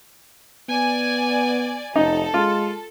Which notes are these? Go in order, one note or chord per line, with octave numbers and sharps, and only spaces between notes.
B3 D5 G#5
F1 D#4 A4
G#3 F4